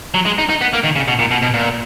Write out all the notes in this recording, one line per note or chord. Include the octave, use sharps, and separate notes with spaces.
F#3
G#3
D#4
D#4
B3
A#3
D#3
C#3
B2
A#2
B2
B2
A#2